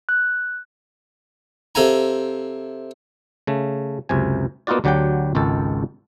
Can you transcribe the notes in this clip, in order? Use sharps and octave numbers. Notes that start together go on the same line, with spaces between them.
F#6
C3 A4 F5 G#5 A#5
C#3 A3
C#2 F#2 C3 G#5
A#3 B3 D#4 F4 F#4 D5
D2 D3 F#3 G4 F#5 G5
G#1 C#2 D#3 G#3 A4